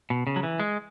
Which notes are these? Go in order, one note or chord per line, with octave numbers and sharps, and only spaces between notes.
B2
C#3
F#3
E3
G#3